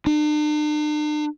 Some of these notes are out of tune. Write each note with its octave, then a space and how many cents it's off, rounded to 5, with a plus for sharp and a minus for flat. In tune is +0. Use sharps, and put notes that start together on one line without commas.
D4 +45